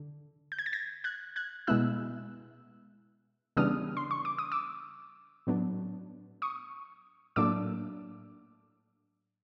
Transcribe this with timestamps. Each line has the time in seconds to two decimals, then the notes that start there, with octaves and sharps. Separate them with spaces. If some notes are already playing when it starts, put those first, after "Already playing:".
Already playing: D3
0.52 G6
0.59 G#6
0.66 A6
0.73 G#6 A#6
1.04 F#6 G#6
1.36 F#6 G#6
1.67 B2 G#3 B3 E4 E6 F#6
3.57 C#3 E3 G3 B3 D4 D#6 F6
3.97 C6
4.11 C#6
4.25 D6
4.39 D#6
4.52 D6 E6
5.47 A2 F#3 B3 D4
6.42 C#6 D#6
7.36 A2 F#3 A#3 D4 D6 E6